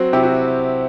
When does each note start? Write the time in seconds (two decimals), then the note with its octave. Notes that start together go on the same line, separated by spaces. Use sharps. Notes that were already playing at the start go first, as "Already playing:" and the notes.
Already playing: F#3 C4 F#4
0.13 C3 E4 G4
0.23 F#4